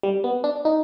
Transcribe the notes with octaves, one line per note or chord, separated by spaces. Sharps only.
G3
B3
D4
D#4